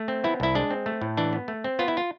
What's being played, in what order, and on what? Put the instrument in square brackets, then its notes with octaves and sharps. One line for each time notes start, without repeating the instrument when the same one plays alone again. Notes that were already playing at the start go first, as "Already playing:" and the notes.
Already playing: [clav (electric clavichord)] A3
C4
B3 E4
C2 E4
G#3 D4
C4
A3
A2
E3 D4
B3
A3
C4
B3 F4
E4
F4